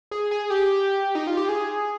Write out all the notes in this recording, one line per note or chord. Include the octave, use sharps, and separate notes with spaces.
G#4
G#4
G4
D#4
F4
G4
G#4